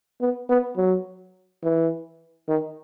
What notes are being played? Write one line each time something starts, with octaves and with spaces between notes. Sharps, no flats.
B3
B3
F#3
E3
D#3